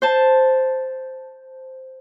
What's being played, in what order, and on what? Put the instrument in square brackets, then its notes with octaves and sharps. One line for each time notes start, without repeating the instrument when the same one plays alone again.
[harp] C5 A5